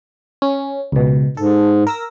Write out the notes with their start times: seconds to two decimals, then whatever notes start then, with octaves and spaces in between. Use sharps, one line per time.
0.42 C#4
0.92 C#2 B2
1.37 G#2 A4
1.87 A#4 E6 A#6